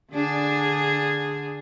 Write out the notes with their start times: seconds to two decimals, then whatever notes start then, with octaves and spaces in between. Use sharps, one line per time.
0.13 D3 D4 G#4